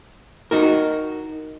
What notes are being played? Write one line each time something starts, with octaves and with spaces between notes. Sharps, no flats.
D#4 F#4 A#4